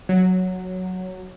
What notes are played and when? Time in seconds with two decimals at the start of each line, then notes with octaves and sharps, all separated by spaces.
0.09 F#3